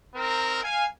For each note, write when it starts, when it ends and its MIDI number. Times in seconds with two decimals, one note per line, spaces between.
0.14 0.62 60
0.14 0.62 63
0.14 0.62 70
0.63 0.84 77
0.63 0.84 80